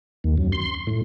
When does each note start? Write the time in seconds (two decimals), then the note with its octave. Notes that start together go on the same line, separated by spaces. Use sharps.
0.24 D#2
0.38 F#2
0.52 C6
0.87 A2